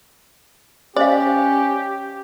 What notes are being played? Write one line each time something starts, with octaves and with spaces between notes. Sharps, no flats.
C#4 G4 C5 D5 D#5 F5